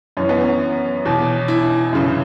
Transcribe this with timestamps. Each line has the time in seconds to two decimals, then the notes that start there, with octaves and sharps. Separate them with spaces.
0.17 F#2 E3 C#4
0.29 B3
0.41 C#4
1.05 E2 B2
1.48 E4
1.93 F#2 C#3 E3